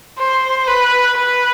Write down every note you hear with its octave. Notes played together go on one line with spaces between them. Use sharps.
C5
B4
B4